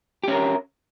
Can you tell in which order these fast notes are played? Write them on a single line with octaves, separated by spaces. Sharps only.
G4 C#4 A#4